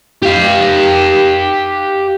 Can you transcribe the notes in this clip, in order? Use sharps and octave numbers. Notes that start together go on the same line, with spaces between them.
G4 F5